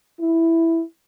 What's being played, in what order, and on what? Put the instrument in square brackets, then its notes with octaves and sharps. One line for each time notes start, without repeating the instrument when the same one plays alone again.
[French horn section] E4